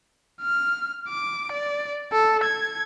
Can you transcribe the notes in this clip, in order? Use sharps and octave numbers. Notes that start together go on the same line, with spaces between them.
F6
D6
D5
A4
G#6